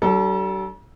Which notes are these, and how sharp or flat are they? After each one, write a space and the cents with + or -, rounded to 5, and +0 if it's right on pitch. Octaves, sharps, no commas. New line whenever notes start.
G3 -40 D4 +5 A4 +0